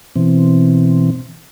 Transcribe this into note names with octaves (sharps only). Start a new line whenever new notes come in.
B2 E3 C4